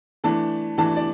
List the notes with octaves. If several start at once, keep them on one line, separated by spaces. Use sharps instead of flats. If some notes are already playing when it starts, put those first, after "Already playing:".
E3 A3 D4 A5
E3 A3 D4 A5
D5